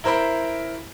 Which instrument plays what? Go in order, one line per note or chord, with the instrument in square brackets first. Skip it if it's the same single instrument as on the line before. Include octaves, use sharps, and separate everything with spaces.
[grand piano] E4 A#4 C5 E5 B5